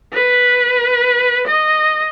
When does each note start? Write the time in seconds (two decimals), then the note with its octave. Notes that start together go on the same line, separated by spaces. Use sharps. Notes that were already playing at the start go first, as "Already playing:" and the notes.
0.13 B4
1.47 D#5